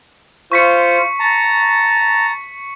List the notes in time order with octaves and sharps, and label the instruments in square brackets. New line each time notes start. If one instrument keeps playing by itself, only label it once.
[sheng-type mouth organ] F4 C5 [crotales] C#6 B6 C#7
[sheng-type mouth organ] A5 A#5